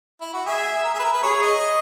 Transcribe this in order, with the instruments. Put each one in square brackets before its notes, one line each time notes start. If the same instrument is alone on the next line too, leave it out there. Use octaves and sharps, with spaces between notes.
[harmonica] E4
F#4
[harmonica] G#4 [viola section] E5
[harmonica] A#4
G#4
B4
A#4
B4
[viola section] G#4 [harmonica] C#5
[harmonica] D#5